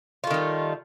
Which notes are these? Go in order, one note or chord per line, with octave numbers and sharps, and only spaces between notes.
D#3 G3 A3 F4